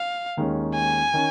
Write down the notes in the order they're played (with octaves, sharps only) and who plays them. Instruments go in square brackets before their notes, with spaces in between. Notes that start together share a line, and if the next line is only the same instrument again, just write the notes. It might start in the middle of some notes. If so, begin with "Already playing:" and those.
Already playing: [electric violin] F5
[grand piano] D#2 D#3 G#3 C#4
[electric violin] G#5
[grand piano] D#3 C#4